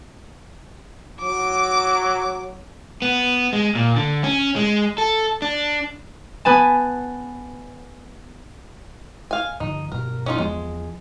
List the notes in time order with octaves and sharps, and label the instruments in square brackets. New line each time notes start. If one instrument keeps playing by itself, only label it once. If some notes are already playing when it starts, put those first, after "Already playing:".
[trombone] F#3 [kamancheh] D6
[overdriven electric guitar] B3
G#3
A#2
D3
C#4
G#3
A4
D4
[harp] B3 B4 G#5 A5
[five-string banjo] F5 G#5
[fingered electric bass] G2 D3 F3 [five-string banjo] D#4
[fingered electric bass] G2 B2 F#3 [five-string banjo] A#4
[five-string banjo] C#4 D#4 F4
[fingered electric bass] E2 F3 B3 [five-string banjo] G#3